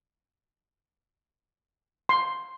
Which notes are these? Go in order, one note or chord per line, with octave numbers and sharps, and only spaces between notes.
C6